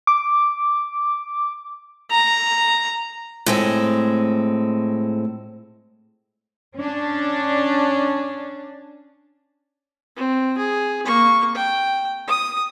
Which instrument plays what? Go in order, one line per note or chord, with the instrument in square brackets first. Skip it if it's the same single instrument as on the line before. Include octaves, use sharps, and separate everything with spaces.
[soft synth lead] D6
[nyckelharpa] A#5
[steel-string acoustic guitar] A2 G#3 C4
[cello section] C#4 D4
[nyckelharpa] C4
G#4
A#3 C#6
G5
D#6